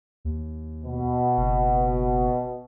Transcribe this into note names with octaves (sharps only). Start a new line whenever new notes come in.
D#2
B2
F#1